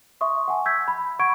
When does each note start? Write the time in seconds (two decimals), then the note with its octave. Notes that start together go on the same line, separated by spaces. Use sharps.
0.21 E5 C6 C#6 D#6
0.48 F#5 G#5 A5
0.66 E6 G6 G#6 B6
0.88 B5
1.19 F#5 B5 C#6 G#6 D7